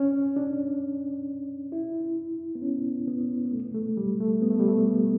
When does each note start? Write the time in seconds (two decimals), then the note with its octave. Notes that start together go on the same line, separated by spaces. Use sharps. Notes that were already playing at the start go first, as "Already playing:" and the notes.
Already playing: C#4
0.36 D4
1.72 E4
2.55 B3
2.62 C#4
3.07 B3
3.45 B3
3.52 A3
3.75 A3
3.97 G3
4.20 A3
4.42 B3
4.51 A3
4.60 G3
4.68 A3
4.87 B3